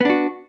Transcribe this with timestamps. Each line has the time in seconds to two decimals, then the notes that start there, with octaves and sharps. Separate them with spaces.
0.01 B3
0.05 D4
0.10 F#4